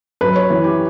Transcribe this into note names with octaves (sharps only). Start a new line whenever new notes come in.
F#2 B4
C#5
E3
G4